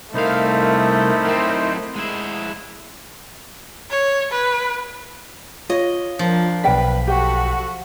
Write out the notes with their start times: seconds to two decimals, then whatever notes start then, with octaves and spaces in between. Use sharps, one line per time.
0.14 C2 A3 D#4 E4 A#4 C5 F5
1.25 F#3 C4
1.96 G#3 E4
3.91 C#5
4.31 B4
5.70 F4 C#5 D#5
6.19 F3 D4 A#4
6.64 B1 B4 D5 G5 B6
7.07 F#4 G4 A4